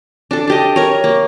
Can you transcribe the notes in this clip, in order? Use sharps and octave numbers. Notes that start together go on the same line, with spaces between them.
D4 A4
D4 G4 D#5
A#4 C#5
A#3